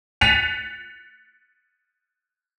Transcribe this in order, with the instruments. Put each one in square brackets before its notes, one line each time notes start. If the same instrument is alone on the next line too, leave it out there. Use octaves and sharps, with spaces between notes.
[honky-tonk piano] F#6 A6 B6 C#7 D#7 F7